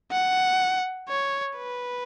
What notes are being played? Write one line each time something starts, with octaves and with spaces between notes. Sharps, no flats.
F#5
C#5
B4